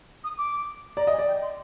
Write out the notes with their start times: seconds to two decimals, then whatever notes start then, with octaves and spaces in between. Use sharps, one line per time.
0.24 D#6
0.38 D6
0.97 D5 A#5
1.07 D#5
1.12 G#5
1.19 D5
1.27 G5
1.42 C6